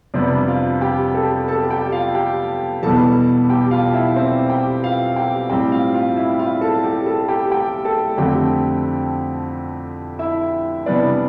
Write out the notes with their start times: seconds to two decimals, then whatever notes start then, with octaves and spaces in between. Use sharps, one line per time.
0.14 F2 C3 G3 B3 D4 D5
0.48 F4 F5
0.81 G4 G5
1.15 A4 A5
1.48 A4 A5
1.70 G4 G5
1.92 F4 F5
2.15 G4 G5
2.83 E2 B2 G3 B3 A4 A5
3.49 G4 G5
3.71 F4 F5
3.94 E4 E5
4.16 C4 C5
4.49 G4 G5
4.83 F4 F5
5.16 G4 G5
5.50 A2 G3 C4 G4 G5
5.72 F4 F5
5.94 F4 F5
6.17 E4 E5
6.39 F4 F5
6.61 A4 A5
6.84 G4 G5
7.06 A4 A5
7.28 G4 G5
7.51 G4 G5
7.85 A4 A5
8.18 F2 D3 A3 C4 G4 G5
10.19 E4 E5
10.86 C3 E3 G3 B3 D4 D5